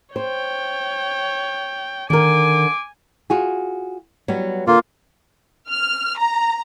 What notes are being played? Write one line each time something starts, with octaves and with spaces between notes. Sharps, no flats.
C5 C#5 G5
D3 D#3 A#4 G#5 D6
F4 F#4 G#4
F#3 G3 B3
D3 A#3 F4
F6
A#5